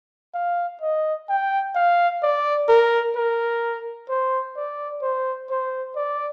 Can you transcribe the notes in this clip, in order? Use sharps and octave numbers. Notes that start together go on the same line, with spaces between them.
F5
D#5
G5
F5
D5
A#4
A#4
C5
D5
C5
C5
D5